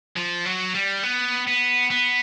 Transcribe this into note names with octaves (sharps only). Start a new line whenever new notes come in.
F3
F#3
G3
B3
B3
B3